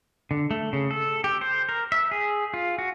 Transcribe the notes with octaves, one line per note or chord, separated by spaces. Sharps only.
D3
A3
C#3
A4
G4
C5
A#4
E5
G#4
F4
F#4